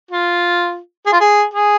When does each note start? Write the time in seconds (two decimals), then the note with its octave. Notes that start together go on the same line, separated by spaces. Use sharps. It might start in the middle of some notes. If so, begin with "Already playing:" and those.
0.11 F4
1.06 G#4
1.13 F4
1.20 G#4
1.54 G#4